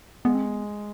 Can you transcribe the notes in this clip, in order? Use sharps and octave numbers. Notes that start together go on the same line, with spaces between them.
G#3 B3
C4
B3